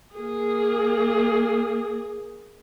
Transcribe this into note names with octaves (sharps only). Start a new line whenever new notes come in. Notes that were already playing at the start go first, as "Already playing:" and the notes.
A#3 G#4